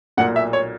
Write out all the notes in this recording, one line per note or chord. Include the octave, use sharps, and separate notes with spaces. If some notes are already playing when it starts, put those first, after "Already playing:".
B1 A#2 A#3 F#5
E5
C#5